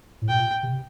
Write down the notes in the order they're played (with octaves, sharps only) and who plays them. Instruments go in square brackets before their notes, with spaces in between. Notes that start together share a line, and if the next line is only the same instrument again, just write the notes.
[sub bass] A2
[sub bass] A#2 [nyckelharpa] G5
[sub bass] C3